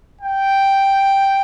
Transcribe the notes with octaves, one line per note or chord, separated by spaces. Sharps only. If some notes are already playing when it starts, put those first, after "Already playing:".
G5